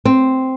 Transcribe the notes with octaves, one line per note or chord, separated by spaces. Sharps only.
C4